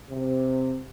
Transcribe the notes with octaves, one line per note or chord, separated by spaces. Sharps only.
C3